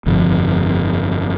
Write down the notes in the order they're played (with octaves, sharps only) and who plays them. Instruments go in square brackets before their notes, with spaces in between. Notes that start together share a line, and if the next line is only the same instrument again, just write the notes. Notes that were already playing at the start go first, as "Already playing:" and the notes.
[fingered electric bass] G1 F2 C3